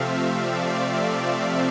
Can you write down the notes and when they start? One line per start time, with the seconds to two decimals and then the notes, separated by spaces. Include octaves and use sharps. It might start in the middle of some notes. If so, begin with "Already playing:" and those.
Already playing: C3 F3 A3 C4 E5 F5
0.31 D5
0.94 D5